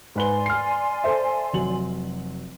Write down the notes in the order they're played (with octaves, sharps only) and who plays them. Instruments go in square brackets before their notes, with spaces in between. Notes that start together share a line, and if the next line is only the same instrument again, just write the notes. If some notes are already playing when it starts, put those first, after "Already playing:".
[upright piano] G#2 B4 G7 [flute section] D5 G#5 C6
[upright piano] F6 C7
A4 C5 E5
F1 F#3 F#7